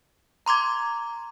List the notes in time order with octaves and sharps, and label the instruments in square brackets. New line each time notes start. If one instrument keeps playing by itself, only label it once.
[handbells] A#5 C6 D6 G#6